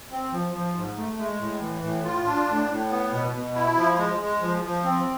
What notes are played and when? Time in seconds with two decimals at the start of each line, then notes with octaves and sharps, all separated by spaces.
0.11 C4
0.32 F3
0.54 F3
0.75 G#2
0.97 A3
1.19 G#3
1.40 A2
1.61 E3
1.83 A2
2.04 F4
2.26 D4
2.48 A2
2.69 A2
2.90 B3
3.12 B2
3.33 B2
3.55 E4
3.78 F3
3.99 G#3
4.20 G#3
4.42 F3
4.63 F3
4.84 C4